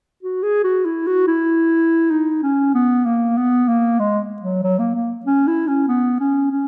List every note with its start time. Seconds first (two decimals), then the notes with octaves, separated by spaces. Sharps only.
0.23 F#4
0.43 G#4
0.64 F#4
0.85 E4
1.07 F#4
1.27 E4
2.11 D#4
2.43 C#4
2.74 B3
3.06 A#3
3.37 B3
3.69 A#3
3.99 G#3
4.42 F#3
4.63 F#3
4.79 A#3
4.95 A#3
5.25 C#4
5.47 E4
5.67 C#4
5.88 B3
6.20 C#4
6.51 C#4